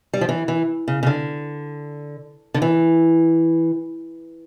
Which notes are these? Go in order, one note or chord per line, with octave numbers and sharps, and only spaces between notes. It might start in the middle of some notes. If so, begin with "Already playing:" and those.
G3
F3
E3
E3
C#3
C#3
D3
D3
E3